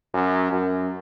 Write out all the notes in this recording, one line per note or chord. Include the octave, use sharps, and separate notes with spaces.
F#2
F#2